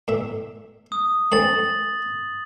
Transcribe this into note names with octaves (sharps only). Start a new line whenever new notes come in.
A2 E5
D#6
A3 C4 C#4 A6 F#7